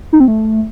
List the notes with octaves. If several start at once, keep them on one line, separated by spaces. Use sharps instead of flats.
D#4
C4
A3